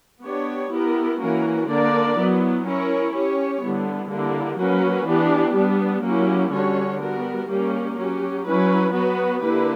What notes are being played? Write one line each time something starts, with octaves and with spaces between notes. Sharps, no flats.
B3 D4 G4 C#5
B3 E4 G4 A#4
E3 A#3 C#4 F#4 A#4
D3 A#3 D4 A#4 D5
F#3 B3 E4
C#4 E4 A#4 C#5
C#4 G4 C#5
D3 G3 B3 E4
D3 A#3 E4 G4
F#3 A#3 C#4 F#4 B4
E3 B3 D4 G4
G3 B3 D4
F#3 A#3 C#4 E4 G4
D3 G3 C#4 F#4 C#5
G3 B3 F#4 A#4
G3 A#3 C#4 G4
F#3 C#4 G4
F#3 C#4 E4 B4
F#3 B3 F#4 B4
D3 A#3 E4 G4 B4